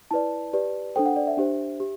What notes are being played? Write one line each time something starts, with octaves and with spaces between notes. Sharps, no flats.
E4 B4 D5 A5
G4 B4 D5
D4 A4 C5 G5
F#5
D5
E5
D4 G4 C5
G4